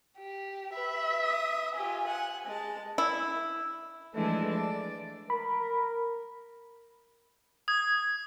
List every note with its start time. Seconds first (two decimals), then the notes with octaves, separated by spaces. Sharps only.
0.19 G4
0.74 B4 E5
1.25 D#6
1.76 F4 G4 G#5
2.07 F#5
2.46 G#3 A5
2.98 E4
4.14 E3 F3 G#3 A3 D4 E4
4.49 D5
5.30 A#4 B5
7.68 D#6 G#6